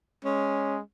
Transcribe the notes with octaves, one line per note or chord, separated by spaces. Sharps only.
G#3 C#4